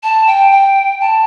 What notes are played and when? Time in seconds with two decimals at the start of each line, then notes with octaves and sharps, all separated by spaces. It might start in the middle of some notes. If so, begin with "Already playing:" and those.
0.03 A5
0.27 G5
0.51 G5
1.01 A5